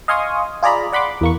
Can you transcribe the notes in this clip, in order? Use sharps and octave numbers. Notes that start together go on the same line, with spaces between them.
D#5 F5 G#5 C6 C#6 D#6
F4 G#4 D5 A#5 B5
D5 F#5 B5 C6 D6
E2 A#3 C#6